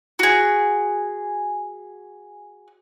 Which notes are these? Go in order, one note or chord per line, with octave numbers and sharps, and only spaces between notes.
F#4 G#4